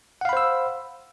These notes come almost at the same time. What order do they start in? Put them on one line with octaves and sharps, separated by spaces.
F#5 F5 B5 C5 E6